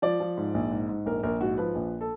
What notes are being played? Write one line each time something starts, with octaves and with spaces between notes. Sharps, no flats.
F3 D5
F3
G#2
A#1
G#2
G#2
A#1 A#4
A#1 A#4
G#2 F#4
F3 B4
A#1
A4